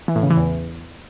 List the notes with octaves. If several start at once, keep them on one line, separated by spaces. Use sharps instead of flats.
E3
A2
C#3
E3
E2